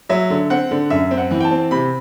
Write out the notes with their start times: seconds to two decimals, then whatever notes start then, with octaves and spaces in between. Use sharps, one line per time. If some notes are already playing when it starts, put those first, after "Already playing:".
0.09 F#3 E5
0.30 D3
0.50 C4 F#5
0.71 D3
0.90 F#2 E5
1.11 C4
1.17 F#5
1.31 E3
1.41 G5
1.44 A5
1.51 C4
1.71 C3 B5